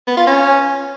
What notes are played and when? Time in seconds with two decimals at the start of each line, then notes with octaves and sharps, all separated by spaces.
0.07 B3
0.17 F4
0.27 C#4